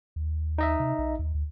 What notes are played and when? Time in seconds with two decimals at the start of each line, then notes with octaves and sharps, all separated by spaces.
0.16 D#2
0.58 D#4 D#5 E5
0.80 C3
0.99 B1
1.19 D#2
1.35 D2